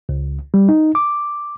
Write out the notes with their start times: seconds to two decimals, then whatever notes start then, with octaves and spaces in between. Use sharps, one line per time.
0.09 C#2
0.54 G3
0.69 D#4
0.95 D6